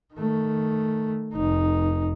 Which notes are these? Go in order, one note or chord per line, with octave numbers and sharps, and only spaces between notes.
D#3 A3
F1 D#4